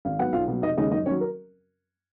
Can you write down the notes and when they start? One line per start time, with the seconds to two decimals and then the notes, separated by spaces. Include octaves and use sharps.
0.05 G#1 F5
0.19 G#2 F#3 B3 F#5
0.33 B1 F4 F5
0.48 B2 F#3
0.62 F1 D#4 D#5
0.77 D#2 C#3 G#3 C#4 D#4 D#5
0.91 F#2 D#4 D#5
1.06 D#3 C#4 C#5
1.11 F#3
1.21 A#4